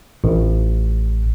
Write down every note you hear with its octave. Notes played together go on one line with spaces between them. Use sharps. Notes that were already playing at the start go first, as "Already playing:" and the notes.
A1